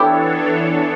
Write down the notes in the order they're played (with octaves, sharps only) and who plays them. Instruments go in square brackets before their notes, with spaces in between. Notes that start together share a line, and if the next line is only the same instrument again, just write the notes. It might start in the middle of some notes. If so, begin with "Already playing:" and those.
Already playing: [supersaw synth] E3 B3 D4 A4 C#5 [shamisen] E4 G4